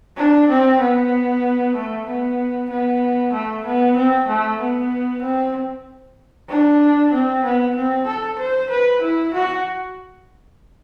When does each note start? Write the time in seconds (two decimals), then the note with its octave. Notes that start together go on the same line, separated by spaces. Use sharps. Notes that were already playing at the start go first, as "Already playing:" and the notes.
0.17 D4
0.49 C4
0.80 B3
1.75 A3
2.07 B3
2.70 B3
3.33 A3
3.65 B3
3.97 C4
4.28 A3
4.59 B3
5.22 C4
6.49 D4
7.12 C4
7.44 B3
7.76 C4
8.07 A4
8.39 C5
8.70 B4
9.01 E4
9.34 F#4